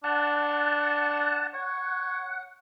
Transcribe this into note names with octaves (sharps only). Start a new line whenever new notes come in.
D4 F#5 A5
C#5 F#5